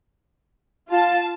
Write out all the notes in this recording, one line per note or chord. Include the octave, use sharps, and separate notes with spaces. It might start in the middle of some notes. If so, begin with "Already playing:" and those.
F4 F5 A5